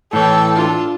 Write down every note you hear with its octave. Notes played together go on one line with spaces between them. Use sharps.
A2 E3 A4 C#5 G5
D4 F4